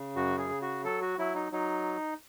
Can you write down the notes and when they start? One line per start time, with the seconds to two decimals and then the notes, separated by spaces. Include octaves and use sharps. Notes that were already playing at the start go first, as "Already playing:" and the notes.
Already playing: C#3
0.15 F#2 F#4
0.38 G#4
0.50 C#3
0.62 F#4
0.84 F#3 A4
1.01 F#4
1.18 F#3 E4
1.35 D#4
1.52 F#3 D#4